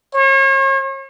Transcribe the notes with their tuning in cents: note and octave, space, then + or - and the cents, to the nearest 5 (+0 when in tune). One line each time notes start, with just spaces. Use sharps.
C#5 -40